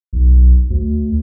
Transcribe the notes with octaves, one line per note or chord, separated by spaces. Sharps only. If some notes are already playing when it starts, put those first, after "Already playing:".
B1
D2